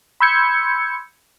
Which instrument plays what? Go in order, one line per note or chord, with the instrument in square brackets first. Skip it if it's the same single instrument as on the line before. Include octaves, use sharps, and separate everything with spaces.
[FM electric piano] B5 C6 E6 G6 G#6 C#7